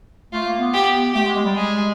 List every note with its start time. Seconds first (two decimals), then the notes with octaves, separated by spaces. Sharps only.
0.32 A3 F4
0.46 A#3
0.59 B3
0.73 G4
1.14 A3 G4
1.25 G#3
1.35 G#3
1.45 G3
1.55 G#3 G#4